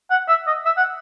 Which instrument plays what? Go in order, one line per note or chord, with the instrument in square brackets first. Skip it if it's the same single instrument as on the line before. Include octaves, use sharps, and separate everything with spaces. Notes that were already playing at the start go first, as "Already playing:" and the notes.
[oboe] F#5
E5
D#5
E5
F#5